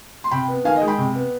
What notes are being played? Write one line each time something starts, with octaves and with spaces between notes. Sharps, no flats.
C6
C3 G5 B5
B3
D#3 F5 G#5
D#5
G#3
G5 B5
C3
B3